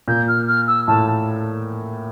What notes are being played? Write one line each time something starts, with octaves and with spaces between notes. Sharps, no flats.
A#2 G6
F6
F6
E6
A2 A5